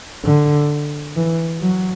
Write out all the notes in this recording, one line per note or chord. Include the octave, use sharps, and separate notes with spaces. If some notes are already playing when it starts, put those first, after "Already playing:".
D3
E3
F#3